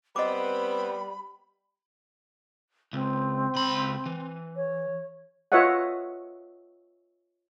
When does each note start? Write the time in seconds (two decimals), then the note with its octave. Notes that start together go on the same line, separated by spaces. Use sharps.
0.16 G3 B3 C4 D#5 B5 D6
2.93 C#2 C4
3.56 C#2 B5
4.06 E3
4.56 C#5
5.52 F4 B4 C#5 D#5 E5 F#5